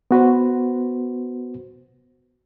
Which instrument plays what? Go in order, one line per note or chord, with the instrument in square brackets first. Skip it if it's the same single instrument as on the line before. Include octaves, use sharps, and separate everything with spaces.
[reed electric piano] B3 F#4 B4 C5